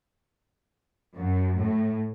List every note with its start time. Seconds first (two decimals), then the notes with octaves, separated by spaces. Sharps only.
1.15 F#2
1.58 A2